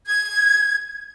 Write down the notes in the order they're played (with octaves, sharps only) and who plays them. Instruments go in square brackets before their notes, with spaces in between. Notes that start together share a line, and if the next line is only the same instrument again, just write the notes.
[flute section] G#6